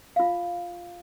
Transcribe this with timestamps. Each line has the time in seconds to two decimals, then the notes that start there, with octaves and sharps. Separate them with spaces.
0.16 F4 F5